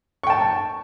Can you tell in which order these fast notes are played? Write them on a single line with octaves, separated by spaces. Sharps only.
C#6 G5 A5